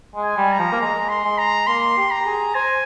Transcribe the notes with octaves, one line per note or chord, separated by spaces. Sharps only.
G#3
G#5
G3
A#5
F3
A#3
G#3 A#5
C6
G#3
A#5
A#3 C6
G4
A#5
G#4
C5 G#5